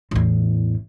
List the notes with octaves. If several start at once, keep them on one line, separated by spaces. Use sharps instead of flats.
A1 E2